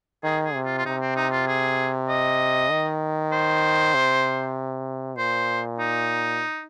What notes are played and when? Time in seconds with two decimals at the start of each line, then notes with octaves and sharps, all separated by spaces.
0.24 D#3 G#4
0.45 G#4
0.55 C3
0.65 F4
0.78 F4
0.85 C3 D#4
1.01 C4
1.16 D#4
1.32 F4
1.48 G#4
2.09 D#5
2.71 D#3
3.32 C5
3.94 C3
5.17 A#2 C5
5.79 D#4